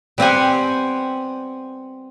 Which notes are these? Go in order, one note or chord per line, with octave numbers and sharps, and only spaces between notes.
G3 B3 C4 G4 F#5 G#5